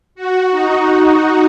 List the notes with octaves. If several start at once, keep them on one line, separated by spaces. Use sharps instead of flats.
F#4
D#4
F#4